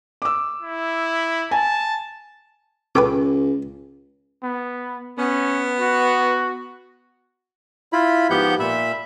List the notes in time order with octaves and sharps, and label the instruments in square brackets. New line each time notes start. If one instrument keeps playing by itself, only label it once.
[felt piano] D6 E6
[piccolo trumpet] E4
[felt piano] G#5 [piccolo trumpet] A5
[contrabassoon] C#2 [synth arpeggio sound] C#4 A4 [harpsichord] B4 G5 D6
[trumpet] B3
[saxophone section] B3 [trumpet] C#4
[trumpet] F#4
[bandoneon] E4 F4 B5
G#2 F3 B3 G4 F#5 G6
A#2 E5 B5